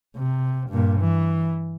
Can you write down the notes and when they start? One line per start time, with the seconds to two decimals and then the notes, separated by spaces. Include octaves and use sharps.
0.17 C3
0.70 G2 A#2
1.00 E3